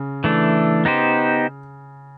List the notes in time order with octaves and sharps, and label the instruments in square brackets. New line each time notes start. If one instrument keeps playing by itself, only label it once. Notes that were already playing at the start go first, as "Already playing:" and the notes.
Already playing: [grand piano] C#3
[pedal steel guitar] E3 A3 D4
B3 D#4 G4 C5